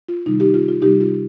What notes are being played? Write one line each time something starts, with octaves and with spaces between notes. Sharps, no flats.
F4
C3 D#3 G3 D#4
D#4 G4
F4
F4
C3 G3 D#4 G4
F4